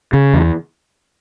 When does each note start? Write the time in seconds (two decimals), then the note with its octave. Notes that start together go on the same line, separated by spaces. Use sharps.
0.13 C#3
0.33 E2